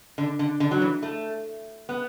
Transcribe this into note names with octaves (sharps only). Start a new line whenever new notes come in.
D3
D3
D3
F#3
E3
A3
B3